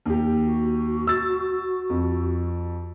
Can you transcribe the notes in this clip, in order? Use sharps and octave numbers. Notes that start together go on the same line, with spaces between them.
D#2 G4
F#4
E6 A6
F2